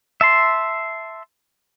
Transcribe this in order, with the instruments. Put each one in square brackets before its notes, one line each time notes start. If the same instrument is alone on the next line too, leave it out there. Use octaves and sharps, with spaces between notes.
[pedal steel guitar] E5 A5 C6